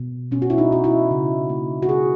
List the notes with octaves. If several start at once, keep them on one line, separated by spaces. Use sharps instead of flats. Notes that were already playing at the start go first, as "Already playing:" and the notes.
Already playing: B2
B2 C#4
F#4
E4
D#4
B2 F#4
E4
C#3
A#3
F#4
C#3 G#4